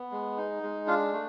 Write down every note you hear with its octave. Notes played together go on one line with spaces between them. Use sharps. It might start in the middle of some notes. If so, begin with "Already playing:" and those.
Already playing: B3
G#3
D#4
G#3
D4 F4 F5
A3